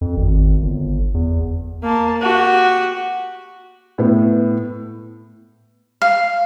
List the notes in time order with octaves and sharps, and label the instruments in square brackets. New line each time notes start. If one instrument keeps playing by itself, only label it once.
[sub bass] F2
G#1
G1
E2
[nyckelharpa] A#3 A5
F#4 G4
[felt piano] A2 B3
[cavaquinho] F5